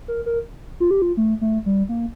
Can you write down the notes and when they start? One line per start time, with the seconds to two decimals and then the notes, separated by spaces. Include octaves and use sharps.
0.08 A#4
0.26 A#4
0.80 F4
0.91 G4
1.02 F4
1.17 A3
1.41 A3
1.66 G3
1.89 A#3